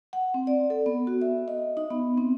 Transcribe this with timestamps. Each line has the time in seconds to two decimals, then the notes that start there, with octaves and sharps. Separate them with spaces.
0.13 F#5
0.34 C4
0.47 D5
0.70 A4
0.86 B3
1.07 F#4
1.22 E5
1.48 D#5
1.77 D#4
1.90 B3
2.17 C4